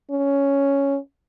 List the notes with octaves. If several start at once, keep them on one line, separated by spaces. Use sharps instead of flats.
C#4